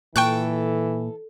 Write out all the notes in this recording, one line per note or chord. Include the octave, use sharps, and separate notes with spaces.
A#2 E3 A4 G5 C#6 F#6